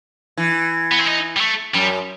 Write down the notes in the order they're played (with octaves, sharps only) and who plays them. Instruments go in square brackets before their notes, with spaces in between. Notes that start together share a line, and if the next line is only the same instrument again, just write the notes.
[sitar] E3
[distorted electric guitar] B3
C4
D#4
G3
A3
[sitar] F#2 [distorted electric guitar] G3